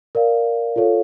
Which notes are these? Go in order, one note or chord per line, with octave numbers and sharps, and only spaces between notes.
A#4 D5 F5
F4 A4 C#5 F5